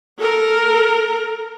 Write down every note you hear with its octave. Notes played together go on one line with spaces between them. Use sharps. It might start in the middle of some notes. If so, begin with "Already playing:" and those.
A4 A#4